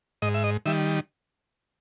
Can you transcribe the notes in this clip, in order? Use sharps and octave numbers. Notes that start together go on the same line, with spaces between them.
G#2 D#5
E5
D#5
D#3 G3 E5